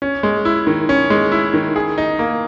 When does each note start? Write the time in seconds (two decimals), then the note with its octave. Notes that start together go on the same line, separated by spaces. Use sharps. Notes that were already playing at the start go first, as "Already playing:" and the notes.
0.02 C#4
0.23 G#3
0.45 E4
0.67 D#3
0.89 C#4
1.10 G#3
1.32 E4
1.54 D#3
1.76 G#4
1.98 D#4
2.19 A#3